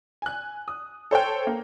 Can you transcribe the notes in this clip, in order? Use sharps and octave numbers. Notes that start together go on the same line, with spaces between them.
G#5 F#6
D#6
A4 C5 C#5 G5
A#3